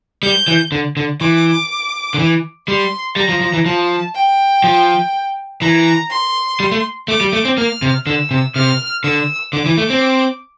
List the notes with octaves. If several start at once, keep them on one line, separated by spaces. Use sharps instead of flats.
G3 G6
E3
D3
D3
E3 D6
D3
E3
G3 C6
G3 A#5
F3
F3
E3
F3 A5
G5
F3
E3 A#5
C6
G3
A3
A3 D6
G3
A3
C4
A#3 F6
C3
D3 E6
C3
C3 F6
D3 E6
D3 D6
E3
A3
C4